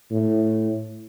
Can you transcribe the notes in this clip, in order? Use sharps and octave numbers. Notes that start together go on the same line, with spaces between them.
A2